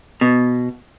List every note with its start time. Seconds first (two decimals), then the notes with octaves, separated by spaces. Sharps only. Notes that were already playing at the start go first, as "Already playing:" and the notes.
0.21 B2